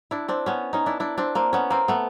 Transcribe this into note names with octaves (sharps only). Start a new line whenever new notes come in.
D4 E4
C4 D4
B3 C#4
C#4 D#4
D4 E4
D4 E4
C4 D4
A#3 C4
B3 C#4
A#3 C4
A3 B3